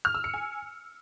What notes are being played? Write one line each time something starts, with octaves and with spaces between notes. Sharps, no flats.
F6
E6
C#7
G#5